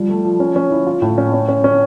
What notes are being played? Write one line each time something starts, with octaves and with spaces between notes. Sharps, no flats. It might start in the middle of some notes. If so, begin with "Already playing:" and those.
Already playing: F3 G3
A3
F3
C#4
C#4
E4
F4
A2
C#4
C#4
C#4
C#4